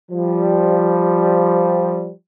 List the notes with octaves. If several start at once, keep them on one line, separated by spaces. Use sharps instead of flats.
F3 G3